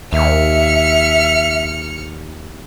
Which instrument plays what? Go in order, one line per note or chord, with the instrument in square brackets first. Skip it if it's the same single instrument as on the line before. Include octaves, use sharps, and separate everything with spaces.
[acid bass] D#2 [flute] E5 [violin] F6 C#7